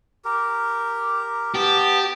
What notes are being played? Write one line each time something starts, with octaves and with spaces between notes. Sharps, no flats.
G4 A#4
B3 G4 A5